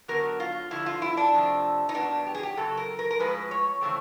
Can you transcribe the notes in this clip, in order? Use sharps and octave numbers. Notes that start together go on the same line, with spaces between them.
D3 F#3 B3 A#4
F4
G2 D3 F3 E4
F4
E4
D4
C3 F3 A3
D#4
A#2 F#3 B3 D4
G4
G#4
G4
F#2 C#3 F#3 A4
A#4
A#4
A#4
A2 F3 G#3 C#4 B4
C#5
C#3 E3 A3 C4